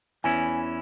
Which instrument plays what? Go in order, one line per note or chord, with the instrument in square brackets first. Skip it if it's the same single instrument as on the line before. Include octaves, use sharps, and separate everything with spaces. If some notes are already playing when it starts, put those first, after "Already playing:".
[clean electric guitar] E2 E3 C#4 E4 [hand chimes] G#5